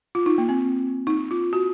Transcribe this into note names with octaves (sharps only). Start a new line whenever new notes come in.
F4
D#4
A#3
C4
D#4
F4
F#4